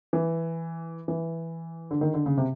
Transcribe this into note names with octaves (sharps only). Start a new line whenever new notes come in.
E3
E3
D3
D#3
D3
C#3
C3